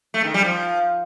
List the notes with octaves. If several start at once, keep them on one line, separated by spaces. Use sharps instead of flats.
A3
D#3
G3
F3